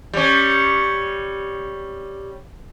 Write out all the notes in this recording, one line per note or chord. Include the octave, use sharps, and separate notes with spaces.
G3 C#4